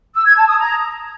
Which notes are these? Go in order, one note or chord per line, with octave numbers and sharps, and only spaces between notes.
E6
G#6
A5
D#6
A#5